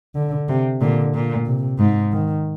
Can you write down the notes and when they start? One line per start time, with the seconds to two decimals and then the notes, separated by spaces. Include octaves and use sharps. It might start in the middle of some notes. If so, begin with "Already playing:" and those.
0.15 D3
0.49 C3
0.81 A#2 D3
1.14 A#2
1.46 C3
1.79 G#2
2.12 D#3